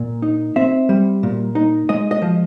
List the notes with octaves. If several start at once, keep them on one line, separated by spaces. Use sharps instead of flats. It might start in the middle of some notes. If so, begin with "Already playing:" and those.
Already playing: A#2
D#4
C4 E5
G3
A#2
D#4
G#3 D#5
D#5
F3